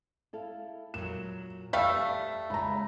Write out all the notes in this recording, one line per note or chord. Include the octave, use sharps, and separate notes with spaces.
E4 A4 F5
A#2 F#3 E7
G3 A3 E5 F5 E6 B6
C#3 G#3 A#5 B5